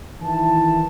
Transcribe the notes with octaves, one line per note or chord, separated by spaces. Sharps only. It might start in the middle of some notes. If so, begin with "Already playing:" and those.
D#3 E3 E4 A5